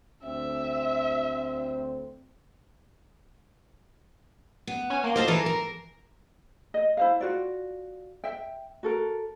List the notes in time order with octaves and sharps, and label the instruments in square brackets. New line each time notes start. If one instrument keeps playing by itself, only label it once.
[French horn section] D2 C4 [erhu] E5
[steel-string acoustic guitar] B3
[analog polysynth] C#4 G#5
A#3 C6
[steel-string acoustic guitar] F4 A4 C5 [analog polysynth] D#5 F5 A5
[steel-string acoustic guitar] E3 A4 B4 [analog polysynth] A#5 C7 E7
[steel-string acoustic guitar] A#4
[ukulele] D#5
E4 C5 F5
F4 F#4 D5
E5 G5
F#4 A4 A#4